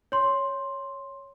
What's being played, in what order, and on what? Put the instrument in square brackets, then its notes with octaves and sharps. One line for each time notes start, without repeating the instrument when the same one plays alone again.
[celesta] C#5 C6